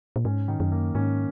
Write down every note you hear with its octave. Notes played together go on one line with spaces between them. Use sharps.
A#2
G#2 C#4
D#3
F#2
A#3
G#2 C#4